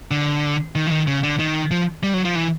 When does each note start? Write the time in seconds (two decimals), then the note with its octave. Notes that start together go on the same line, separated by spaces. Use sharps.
0.11 D3
0.75 D#3
0.87 E3
0.91 D#3
1.07 C#3
1.23 D3
1.39 D#3
1.71 F3
2.03 G3
2.14 F#3
2.25 F3
2.35 E3